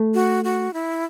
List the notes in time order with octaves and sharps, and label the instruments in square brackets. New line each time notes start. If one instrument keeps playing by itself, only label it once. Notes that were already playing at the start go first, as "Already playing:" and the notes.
Already playing: [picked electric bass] A3
[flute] F#4
F#4
E4